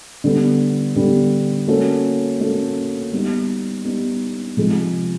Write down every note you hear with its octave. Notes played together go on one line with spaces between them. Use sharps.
D3 G3 B3
D3 G3 B3
A#3 C#4 F#4 A4
A#3 C#4 F#4 A4
G3 B3 D#4
G3 B3 D#4
C3 F3 G#3